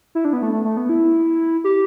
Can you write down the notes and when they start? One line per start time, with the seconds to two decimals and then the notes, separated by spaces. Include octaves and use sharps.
0.15 E4
0.25 D4
0.33 B3
0.42 A3
0.53 A3
0.65 A3
0.77 B3
0.89 E4
1.64 G4